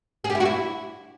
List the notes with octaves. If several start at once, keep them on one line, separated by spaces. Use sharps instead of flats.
G#4
G4
E4
F#4
E4